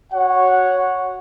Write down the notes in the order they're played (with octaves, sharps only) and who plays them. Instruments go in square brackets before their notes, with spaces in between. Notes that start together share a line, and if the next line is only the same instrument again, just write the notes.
[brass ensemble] F#4 C#5 F#5